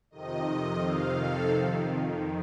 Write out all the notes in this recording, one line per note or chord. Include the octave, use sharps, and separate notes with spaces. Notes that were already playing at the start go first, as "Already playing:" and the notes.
F2 C3 D#3 D#5
F2 C3 D#3 F5
A4
F2 D#3